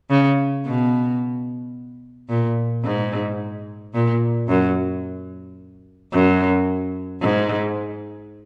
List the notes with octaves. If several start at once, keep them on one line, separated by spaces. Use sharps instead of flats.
C#3
B2
A#2
G#2
A#2
F#2
F#2
G#2